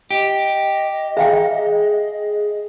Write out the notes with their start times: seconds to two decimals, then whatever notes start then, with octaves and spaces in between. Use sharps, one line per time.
0.11 G4 D#5
1.17 G#4 E5 F5 G5